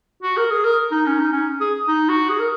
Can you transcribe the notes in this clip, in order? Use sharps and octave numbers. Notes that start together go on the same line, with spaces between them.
F#4
A#4
G#4
A#4
D#4
C#4
D#4
C#4
G#4
D#4
F#4
G#4
A#4